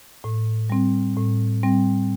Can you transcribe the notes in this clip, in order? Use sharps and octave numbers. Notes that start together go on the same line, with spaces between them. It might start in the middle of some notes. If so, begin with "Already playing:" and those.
A2
G3 C4
A2
G3 C4